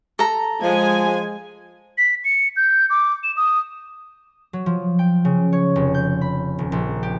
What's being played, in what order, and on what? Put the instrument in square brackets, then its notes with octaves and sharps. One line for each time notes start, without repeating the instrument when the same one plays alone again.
[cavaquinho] A4 A#5
[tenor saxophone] F3 [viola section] G#3 G#5
[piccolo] B6
C#7
G6
D6
E7
D#6
[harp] F#3
F3
G5
C#3
C#5
F1
G6
B5
D#1
A#1
G4